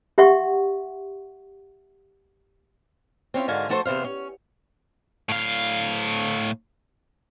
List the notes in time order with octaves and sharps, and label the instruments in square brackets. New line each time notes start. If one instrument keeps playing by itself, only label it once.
[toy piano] G4 E5 F#5 C6 C#6
[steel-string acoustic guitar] C4 C#4 E4 F4
G#2 D3 F#4 A#4 F5 G#5
F3 A3 F#4 A4 A#4 C5
E2 C3 B3 C5 F5
C#4
[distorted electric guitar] A2 F5